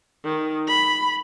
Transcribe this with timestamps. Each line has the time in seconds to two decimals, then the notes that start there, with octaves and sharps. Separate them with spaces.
0.25 D#3
0.68 B5